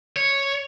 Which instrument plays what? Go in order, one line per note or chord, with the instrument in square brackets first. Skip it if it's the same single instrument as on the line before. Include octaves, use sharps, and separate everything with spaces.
[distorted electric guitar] C#5